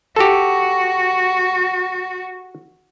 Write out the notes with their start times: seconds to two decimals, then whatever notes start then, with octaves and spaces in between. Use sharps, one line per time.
0.16 F#4 G4 A4